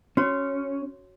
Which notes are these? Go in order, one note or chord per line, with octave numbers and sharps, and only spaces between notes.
C#4 F#4 C#5